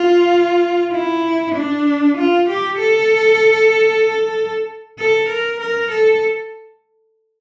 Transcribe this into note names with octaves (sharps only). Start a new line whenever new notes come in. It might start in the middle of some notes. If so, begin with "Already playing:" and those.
Already playing: F4
E4
D4
F4
G4
A4
A4
A#4
A#4
A4